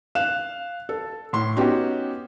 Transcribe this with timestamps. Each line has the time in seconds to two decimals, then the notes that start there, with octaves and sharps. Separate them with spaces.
0.15 F5 F#6 E7
0.89 A4
1.33 A2 C6
1.56 B3 C#4 D#4 F#4 G4